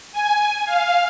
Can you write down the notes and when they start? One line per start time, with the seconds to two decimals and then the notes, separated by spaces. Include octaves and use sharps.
0.12 G#5
0.65 F5